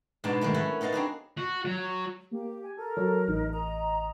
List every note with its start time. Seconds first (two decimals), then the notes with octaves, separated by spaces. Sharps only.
0.24 G#2 B2 G#3 B3 D4 A5
0.41 D#3 F#3 G#3 A3
0.54 C#4 E4 A4 F#5 G#5
0.81 B3 D#4 A#4 F5 A5
0.92 C4 D4 F#4 G#4
1.37 F#4
1.65 F#3
2.31 A#3 G4
2.63 G#5
2.77 A4 A#4
2.97 F#3
3.28 A1 D#4
3.52 D#5 A#5